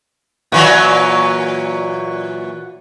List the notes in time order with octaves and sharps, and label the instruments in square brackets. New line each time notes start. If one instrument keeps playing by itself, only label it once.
[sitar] A#2 E3 F#3